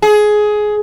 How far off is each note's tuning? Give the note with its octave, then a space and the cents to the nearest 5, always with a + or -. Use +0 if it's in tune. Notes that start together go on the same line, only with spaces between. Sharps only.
G#4 +15